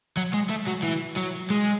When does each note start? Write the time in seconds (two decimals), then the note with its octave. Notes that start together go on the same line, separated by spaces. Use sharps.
0.17 F#3
0.34 G#3
0.50 A3
0.68 F#3
0.83 E3
1.17 F#3
1.50 G#3